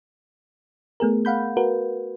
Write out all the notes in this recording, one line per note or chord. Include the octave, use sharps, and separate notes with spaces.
A3 B3 G#4 A#4
F5 F#5 B5 G6
F#4 A#4 B4